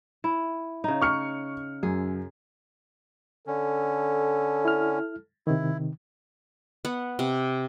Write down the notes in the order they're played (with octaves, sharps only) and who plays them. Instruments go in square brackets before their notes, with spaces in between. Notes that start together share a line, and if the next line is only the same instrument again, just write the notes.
[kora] E4
C#3 D#4
[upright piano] C#6 F6 C#7
[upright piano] F#2 [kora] G#4
[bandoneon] D3 C#4 [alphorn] A4
[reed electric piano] E4 F6
[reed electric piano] C3 D#3 [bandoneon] E4
[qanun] B3 F#5
C3